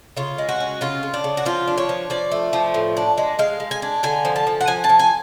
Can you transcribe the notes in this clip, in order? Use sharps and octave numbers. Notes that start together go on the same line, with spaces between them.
C#3 F4
G#3
F#4
C#4
C#3 F4
C#3
D4
C#3
F#4
F3 F4
D4
C#5
F3
F3 D5
A3
F3
A2
D4
G#3
G#3 F5
G#3
G#5
D4
D3 G#5
F3
A5
F3
F#5
F3 G#5
A5
F3
G#5